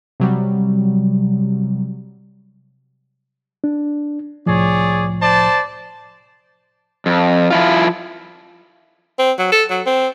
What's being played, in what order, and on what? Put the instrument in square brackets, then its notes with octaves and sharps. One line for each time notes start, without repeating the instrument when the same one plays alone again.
[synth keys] C3 F#3 G3
[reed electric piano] D4
[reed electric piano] C2 A2 F3 [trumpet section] G#4 C#5 D5
[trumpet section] C5 D5 A5
[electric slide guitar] F2
F3 E4 F4
[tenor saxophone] C4
F#3
A4
F#3
C4